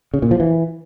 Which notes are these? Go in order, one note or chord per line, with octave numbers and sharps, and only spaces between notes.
C#3
A#2
F3
E3